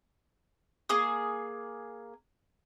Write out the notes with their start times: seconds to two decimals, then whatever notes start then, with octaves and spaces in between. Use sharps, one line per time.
0.89 A#3 G#4 D#6